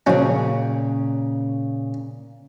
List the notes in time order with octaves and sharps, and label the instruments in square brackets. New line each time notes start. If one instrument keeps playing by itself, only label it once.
[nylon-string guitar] A#2 C#3 [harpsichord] F3 F#3 C#4